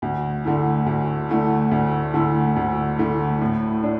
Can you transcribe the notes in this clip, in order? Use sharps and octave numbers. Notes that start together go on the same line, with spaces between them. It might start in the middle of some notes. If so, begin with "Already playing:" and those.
D2
D3 A3 E4
D2
D3 A3 E4
D2
D3 A3 E4
D2
D3 A3 E4
A2
D4